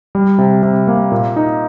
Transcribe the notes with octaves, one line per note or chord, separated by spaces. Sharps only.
G3
C3
C3
A#3
A#2
D#4